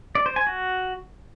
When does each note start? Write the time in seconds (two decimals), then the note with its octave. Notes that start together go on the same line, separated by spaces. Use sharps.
0.15 D5
0.26 C5
0.36 G#5
0.47 F#4